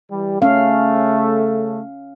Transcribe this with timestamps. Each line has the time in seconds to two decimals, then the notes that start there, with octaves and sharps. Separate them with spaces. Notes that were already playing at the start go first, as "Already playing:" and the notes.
0.11 E3 G3
0.42 C#3 A3 C#4 F5